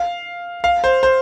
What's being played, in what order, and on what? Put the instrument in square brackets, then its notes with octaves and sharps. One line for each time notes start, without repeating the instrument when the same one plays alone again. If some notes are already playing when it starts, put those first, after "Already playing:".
Already playing: [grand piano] F5
F5
C5
C5